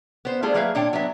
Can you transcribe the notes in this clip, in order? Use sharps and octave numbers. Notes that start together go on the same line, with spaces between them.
B3 C5
G3 A3 F4 G#4 C5
F#3 A#3 G#4 B4 E5 F5
A#2 D4 C#5 G5
F#3 B3 D4 E5